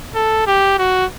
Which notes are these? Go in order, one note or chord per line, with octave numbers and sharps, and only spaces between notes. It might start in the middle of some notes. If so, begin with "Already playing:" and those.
A4
G4
F#4